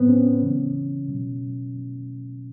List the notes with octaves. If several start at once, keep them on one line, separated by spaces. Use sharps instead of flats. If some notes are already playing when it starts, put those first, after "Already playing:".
Already playing: A2 F#3 B3 C4
C#4
C#3 E3
B2 F#3